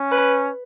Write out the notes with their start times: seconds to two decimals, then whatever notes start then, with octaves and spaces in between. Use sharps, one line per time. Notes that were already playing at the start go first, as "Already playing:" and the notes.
Already playing: C#4
0.11 B4